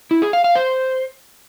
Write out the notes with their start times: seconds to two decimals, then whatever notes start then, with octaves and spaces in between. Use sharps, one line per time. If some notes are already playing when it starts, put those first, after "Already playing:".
0.11 E4
0.22 G#4
0.33 F5
0.44 F5
0.55 C5